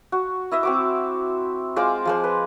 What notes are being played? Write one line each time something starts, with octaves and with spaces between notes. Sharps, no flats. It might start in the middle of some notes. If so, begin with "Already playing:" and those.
F#4
E4 D#5 E5
C4 F#4 D6
G#3 F4 C5 D6
F3 G#3 C5
B4